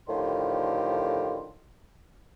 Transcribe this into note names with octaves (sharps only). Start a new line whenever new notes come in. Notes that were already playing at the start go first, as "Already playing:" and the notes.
A2 D3 D#3 F3 G4 C6